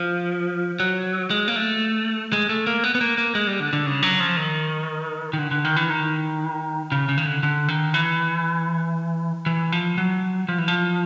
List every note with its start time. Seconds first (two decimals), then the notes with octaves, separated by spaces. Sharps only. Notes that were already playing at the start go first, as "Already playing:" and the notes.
Already playing: F3
0.80 F#3
1.30 G#3
1.48 A#3
1.56 A3
2.33 G#3
2.49 A3
2.67 A#3
2.84 B3
2.95 B3
3.01 A#3
3.18 A#3
3.35 G#3
3.47 G3
3.60 D3
3.73 D3
3.86 C#3
4.03 F#3
4.20 F3
4.37 D#3
5.33 D#3
5.39 D3
5.51 D3
5.65 D#3
5.76 E3
5.90 D#3
6.92 C#3
7.09 C#3
7.18 D#3
7.26 D3
7.43 D3
7.68 D#3
7.94 E3
9.46 E3
9.72 F3
9.98 F#3
10.49 F3
10.58 E3
10.68 F3